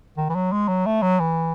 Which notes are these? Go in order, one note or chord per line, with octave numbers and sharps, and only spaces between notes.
D#3
E3
F#3
G#3
F#3
A3
F#3
E3